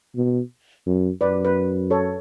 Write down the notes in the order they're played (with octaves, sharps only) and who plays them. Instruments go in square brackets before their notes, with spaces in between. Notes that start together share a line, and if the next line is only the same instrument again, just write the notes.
[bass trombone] B2
F#2
[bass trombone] F#2 [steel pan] B4 D5
[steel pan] B4
A4 C#5